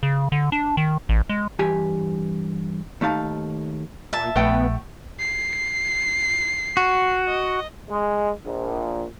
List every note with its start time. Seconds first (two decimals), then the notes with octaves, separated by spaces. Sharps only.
0.03 C#3
0.32 D3
0.52 D4
0.77 D#3
1.09 A1
1.29 G#3
1.59 G2 E3 G4 G#5
3.01 D#2 A3 D#4 F5 A5
4.13 A#2 E5 A5
4.36 A#1 A3 B3 F#5 G5
5.20 C7
6.77 F#4
7.28 D#5
7.89 G#3
8.44 A#1